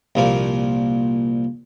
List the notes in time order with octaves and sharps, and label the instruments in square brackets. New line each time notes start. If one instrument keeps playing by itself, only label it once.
[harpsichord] C2 A#2 F3 A#3